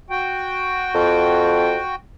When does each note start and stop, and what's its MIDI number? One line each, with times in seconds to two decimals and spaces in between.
0.10 1.95 66
0.10 1.95 79
0.95 1.78 41